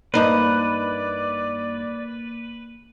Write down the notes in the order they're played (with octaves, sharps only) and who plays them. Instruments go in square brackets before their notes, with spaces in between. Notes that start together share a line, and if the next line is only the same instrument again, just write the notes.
[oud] G2 D#4 C5 [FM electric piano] A#3 [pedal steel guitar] B4 [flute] D5